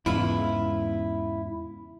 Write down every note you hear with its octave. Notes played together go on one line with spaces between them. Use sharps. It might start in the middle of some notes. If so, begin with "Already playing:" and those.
E2 G#2 C#3 E4 F4